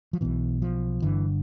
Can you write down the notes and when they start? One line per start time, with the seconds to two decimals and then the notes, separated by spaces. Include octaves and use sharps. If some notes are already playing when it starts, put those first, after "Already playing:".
0.13 F3
0.21 B1 B2 E3
0.62 F3
1.02 G1 G2 D3 E3